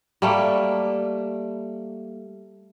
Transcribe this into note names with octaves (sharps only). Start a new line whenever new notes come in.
G3 A3 A#3